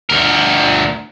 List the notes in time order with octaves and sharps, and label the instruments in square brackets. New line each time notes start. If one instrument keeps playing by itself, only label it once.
[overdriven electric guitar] D2 A#4